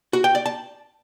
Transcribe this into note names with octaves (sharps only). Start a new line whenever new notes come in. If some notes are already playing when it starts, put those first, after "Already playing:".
F#4
G5
D5
A5